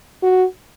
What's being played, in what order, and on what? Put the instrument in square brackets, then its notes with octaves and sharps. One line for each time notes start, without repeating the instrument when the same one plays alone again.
[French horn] F#4